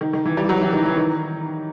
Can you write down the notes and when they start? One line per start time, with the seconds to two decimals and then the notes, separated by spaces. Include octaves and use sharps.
0.01 D#3
0.13 D#3
0.25 E3
0.37 G3
0.49 F#3
0.61 E3
0.73 D#3
0.85 E3
0.97 D#3